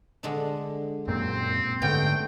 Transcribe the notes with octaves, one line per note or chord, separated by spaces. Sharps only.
D3 G#3 D4
F#2 A#2 C4
G#2 D3 A3 B3 C#4 G5